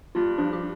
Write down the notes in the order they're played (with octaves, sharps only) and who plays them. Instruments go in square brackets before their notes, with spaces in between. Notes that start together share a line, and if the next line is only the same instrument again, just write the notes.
[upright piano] G2 [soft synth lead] F4
[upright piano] F3 [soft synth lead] D4
[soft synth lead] G4